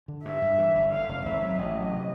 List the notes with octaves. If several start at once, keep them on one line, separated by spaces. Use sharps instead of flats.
D3
G2 E5
G2
E3
G1
D3 F5
F1
G#1 E5
F#3
A1 D#5
F#3
C3